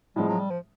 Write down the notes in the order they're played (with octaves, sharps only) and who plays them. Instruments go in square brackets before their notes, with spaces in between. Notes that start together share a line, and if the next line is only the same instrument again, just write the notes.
[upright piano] A2 F3 G#3 C4 [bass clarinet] G3
[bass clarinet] F#3
G3
F3